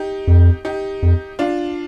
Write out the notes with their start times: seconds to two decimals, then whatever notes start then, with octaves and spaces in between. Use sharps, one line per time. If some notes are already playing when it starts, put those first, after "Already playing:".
Already playing: D#4 G4
0.28 F2
0.65 D#4 G4
1.03 F2
1.39 D4 F4